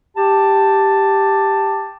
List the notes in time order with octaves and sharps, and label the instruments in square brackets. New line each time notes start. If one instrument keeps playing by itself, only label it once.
[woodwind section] G4 A5